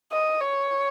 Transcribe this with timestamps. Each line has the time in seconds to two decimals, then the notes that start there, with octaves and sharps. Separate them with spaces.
0.12 D#5
0.40 C#5